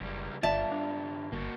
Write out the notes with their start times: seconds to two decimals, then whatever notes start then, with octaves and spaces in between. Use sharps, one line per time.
0.01 F#1 C#2 G3
0.43 G1 G2 F4 D5 E5 A5
0.72 D4
1.32 G1 A#3 F#4